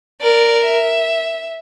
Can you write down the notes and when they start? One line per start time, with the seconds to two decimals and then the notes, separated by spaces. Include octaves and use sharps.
0.21 A#4 D5
0.65 E5